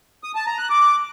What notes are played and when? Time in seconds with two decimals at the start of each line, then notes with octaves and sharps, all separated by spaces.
0.24 D#6
0.35 A5
0.47 A#5
0.58 F#6
0.70 D6